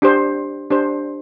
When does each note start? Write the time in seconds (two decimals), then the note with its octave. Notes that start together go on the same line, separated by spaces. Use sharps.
0.02 D4 G4 C5
0.70 D4 G4 C5